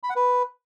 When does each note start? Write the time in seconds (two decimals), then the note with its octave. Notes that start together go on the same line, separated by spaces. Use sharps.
0.03 B5
0.10 F#5
0.16 B4